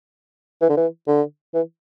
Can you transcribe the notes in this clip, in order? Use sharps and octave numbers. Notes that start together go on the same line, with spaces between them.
E3
D3
E3
D3
E3